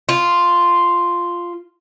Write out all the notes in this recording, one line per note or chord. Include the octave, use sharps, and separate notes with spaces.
F4